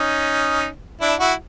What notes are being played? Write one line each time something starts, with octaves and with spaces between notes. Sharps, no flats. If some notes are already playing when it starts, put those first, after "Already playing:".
Already playing: C#4 D#4
D4 E4
E4 F#4